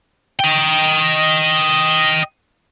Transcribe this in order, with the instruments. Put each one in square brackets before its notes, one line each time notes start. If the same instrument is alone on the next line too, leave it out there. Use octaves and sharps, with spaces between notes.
[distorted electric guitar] D#5 G5